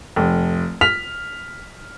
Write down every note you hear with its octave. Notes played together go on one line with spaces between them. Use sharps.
F1
F6 B6 F7